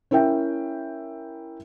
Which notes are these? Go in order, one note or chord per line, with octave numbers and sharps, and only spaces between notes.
C#4 E4 A#4 E5 G5